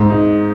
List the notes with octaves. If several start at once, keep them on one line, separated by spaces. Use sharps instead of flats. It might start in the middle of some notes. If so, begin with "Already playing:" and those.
Already playing: G#2
D#4